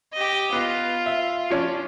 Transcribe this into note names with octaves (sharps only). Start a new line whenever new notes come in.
G4 D#5
B3 F4
E5
F3 C#4 D4